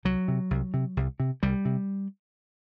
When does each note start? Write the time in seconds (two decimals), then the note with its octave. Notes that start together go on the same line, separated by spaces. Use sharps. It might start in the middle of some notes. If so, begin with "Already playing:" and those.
0.05 C2 F#3
0.28 C3
0.51 C2
0.74 C3
0.97 C2
1.20 C3
1.43 C2 G3
1.65 C3